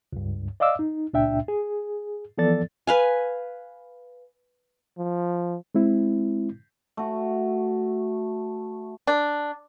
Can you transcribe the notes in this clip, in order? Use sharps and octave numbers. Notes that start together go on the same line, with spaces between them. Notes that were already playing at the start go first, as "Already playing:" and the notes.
C#2 G2
D5 D#5 F5 D6 E6
D#4
C#2 A#2 D4 E5 G5
G#4
E3 F3 B3 A4 D5 A6
B4 F5 G#5
F3
G#3 C4 E4
A3 F#4
D4